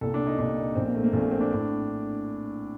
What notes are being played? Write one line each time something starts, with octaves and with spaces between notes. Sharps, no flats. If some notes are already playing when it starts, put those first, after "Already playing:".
C2 A#2 A4
D4
D#4
C2 A#2 D4
A#1 A#2 C4
A#3
A3
A#3
A#1 A#2 A3
A#3
C4
D4
A2